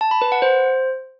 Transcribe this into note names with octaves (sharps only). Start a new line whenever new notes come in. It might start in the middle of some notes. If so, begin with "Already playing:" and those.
A5
B5
B4
F#5
C5